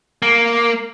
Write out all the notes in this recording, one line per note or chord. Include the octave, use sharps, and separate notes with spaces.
A#3